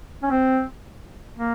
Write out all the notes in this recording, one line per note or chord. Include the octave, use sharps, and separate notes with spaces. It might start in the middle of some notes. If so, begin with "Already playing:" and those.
C#4
C4
A#3